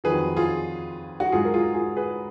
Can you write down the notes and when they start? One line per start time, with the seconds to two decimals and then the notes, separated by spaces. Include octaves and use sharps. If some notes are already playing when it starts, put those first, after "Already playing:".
0.04 F2 D#3 F#3 G#4 B4
0.36 F4 G#4
1.20 F#4
1.32 G#2 F#3 F4 G#4
1.45 A#4
1.54 F4 G#4
1.74 F4 G#4
1.96 G#4 B4